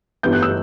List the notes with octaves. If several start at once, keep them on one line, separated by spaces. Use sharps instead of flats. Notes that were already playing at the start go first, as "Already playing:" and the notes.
G1 G2 E3 B3 E4 G6
F#6
E6